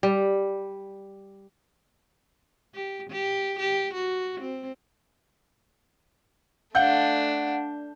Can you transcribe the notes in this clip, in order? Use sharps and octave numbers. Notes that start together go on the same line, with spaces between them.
G3
G4
G4
G4
F#4
C4
A3 D4 F5 F#5 G6